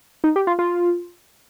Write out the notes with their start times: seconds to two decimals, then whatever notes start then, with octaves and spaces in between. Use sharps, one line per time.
0.24 D#4
0.36 G4
0.47 F4
0.59 F4